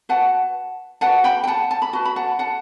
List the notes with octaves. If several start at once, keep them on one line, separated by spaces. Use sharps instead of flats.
F#4 B4 F#5 A5
F#4 B4 F#5 A5
G5 B5
G5
F#5 A5
A5
B5
F#4 B4 A5
B5
F#5 A5
F#5 A5